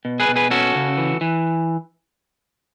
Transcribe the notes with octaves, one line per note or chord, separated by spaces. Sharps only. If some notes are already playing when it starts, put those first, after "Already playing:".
B2
G#4 B4
B2
G#4 B4
C#4 F#4 A4
C#3
E3
E3